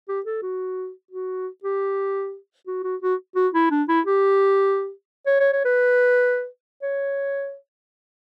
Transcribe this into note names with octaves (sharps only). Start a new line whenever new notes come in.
G4
A4
F#4
F#4
G4
F#4
F#4
F#4
F#4
E4
D4
E4
G4
C#5
C#5
C#5
B4
C#5